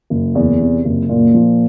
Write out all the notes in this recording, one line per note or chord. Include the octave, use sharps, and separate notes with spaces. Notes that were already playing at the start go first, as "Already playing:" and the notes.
F#1
E2
C3
F#1
A#2
F3